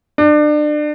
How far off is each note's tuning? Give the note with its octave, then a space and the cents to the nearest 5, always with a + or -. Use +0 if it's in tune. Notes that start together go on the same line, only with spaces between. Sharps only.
D4 +30